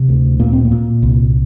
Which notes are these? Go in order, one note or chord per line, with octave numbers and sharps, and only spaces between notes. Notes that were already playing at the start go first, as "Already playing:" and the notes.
Already playing: C3
D2
A#2 A#3
C4
A#3
A#2
C2